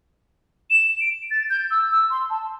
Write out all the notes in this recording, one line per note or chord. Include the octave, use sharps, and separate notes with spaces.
E7
D7
A6
G6
E6
E6
C6
A5